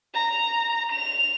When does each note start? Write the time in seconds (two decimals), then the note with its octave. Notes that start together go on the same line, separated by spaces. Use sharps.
0.14 A#5
0.91 F7